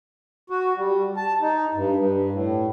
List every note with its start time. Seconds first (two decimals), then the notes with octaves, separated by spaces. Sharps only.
0.50 F#4
0.77 G3
1.17 A5
1.41 D#4
1.74 G2
1.96 G2
2.32 A2